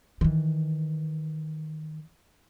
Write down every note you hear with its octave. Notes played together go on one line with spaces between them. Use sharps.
D#3 E3